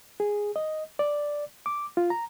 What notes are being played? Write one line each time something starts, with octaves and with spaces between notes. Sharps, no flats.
G#4
D#5
D5
D6
F4
A#5